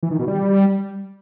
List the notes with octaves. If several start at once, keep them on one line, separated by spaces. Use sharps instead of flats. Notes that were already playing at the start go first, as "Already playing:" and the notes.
E3
D#3
B2
G3